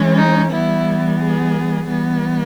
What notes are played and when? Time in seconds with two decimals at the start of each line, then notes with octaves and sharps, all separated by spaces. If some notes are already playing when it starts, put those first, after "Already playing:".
Already playing: E3 G#3 C#4
0.17 D#4
0.51 E3 G3 B3 E4
1.19 G#4
1.87 E3 G3 B3